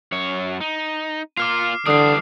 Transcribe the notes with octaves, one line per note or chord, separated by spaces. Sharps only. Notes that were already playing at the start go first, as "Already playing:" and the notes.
F#2 C#5
D#4
A#3 F4 D6 F6 C7
D3 E3 G3 D4 D#6 C7